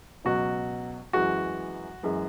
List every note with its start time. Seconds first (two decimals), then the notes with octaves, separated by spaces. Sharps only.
0.25 C#2 B2 F#3 F#4
1.13 F#2 E3 G#3 F#4
2.03 F#2 E3 G#3